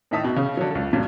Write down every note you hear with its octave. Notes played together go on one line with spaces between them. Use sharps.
A2 D#3 D#4 E5 A5 D#6
B2
C#3
D3 F#3
C#2 A4
G2 A#2 F#3